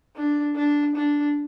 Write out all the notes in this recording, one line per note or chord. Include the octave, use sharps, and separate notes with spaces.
D4
D4
D4